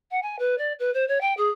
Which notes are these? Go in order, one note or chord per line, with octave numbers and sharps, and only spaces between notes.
F#5
G#5
B4
D5
B4
C5
C#5
G5
G#4